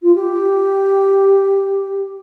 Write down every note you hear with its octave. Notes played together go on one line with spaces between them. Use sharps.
F4
G4